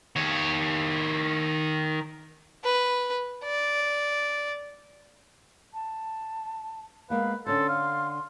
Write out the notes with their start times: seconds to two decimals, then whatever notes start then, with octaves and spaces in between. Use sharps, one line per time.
0.16 D#3 C#5
2.64 B4
3.44 D5
5.74 A5
7.10 G#3 A#3 B3 B4 F5
7.46 D3 C#4 A4 C5 C6
7.69 F5